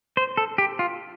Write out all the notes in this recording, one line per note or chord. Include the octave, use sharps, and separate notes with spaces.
C5
A4
G4
F4